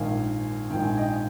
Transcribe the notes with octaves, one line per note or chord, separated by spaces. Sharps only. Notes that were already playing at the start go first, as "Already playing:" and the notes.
Already playing: A#1 G#2 D#3 F5 G#5
A#1 G#2 D#3 G5
G#5
D#5 G5